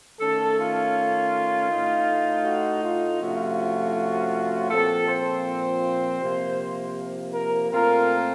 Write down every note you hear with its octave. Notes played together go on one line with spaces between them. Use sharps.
D#3 A3 C#4 A4
F4
A2 A3 D#4
F#4
F4
C3 F3 A3 C#4 F4 F#4
F#4
A#2 F3 C4 A4
C5
C3 F3 A#3
A#4
A#2 A3 C4 F4 A#4